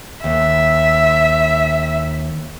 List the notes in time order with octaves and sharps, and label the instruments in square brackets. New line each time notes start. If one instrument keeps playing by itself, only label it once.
[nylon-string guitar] D#2 [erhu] E5